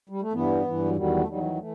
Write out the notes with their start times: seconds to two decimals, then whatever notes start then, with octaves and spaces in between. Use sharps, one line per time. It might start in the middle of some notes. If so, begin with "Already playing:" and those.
0.09 G3
0.21 A3
0.33 G2 E3 B3
0.64 G2 E3
0.85 F#3
0.96 E2 D#3 F#3 G3
1.17 A3
1.27 E2 D#3 F#3 G3
1.43 G3
1.54 G3
1.59 E3 A3